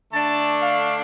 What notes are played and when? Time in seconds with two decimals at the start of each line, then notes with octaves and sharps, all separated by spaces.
0.13 D3 A3 D4 A5
0.63 F5